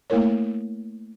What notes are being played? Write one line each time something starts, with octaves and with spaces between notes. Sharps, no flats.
A3 A#3 E4 A#4 C#5